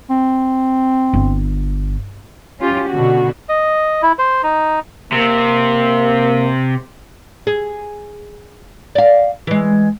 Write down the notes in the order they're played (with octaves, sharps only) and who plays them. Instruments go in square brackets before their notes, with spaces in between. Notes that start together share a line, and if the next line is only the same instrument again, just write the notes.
[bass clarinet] C4
[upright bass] G1
[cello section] C#4 F4 G4
B2 D3 F#4
[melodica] D#5
E4
C5
D#4
[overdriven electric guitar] C3 [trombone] A#3
[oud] G#4
D5 F5
E3 G#3